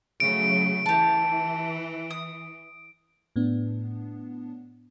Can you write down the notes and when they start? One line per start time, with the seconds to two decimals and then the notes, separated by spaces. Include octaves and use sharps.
0.20 C#3 F#3 A3 D7
0.86 E3 G4 A5
2.11 D#6
3.36 A2 B3 D4